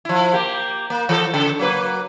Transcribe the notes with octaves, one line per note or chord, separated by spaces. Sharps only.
F3 E4
A#3 G4
A#3
E3 A4
C#3 A4
F#3 A#3 B4